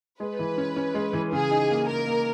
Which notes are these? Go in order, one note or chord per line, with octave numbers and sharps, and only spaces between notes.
G#3 B4
E3
C#4
C#4
G#3
E3
C#3 G#4
D#4
A#3
A#3 A#4
A#3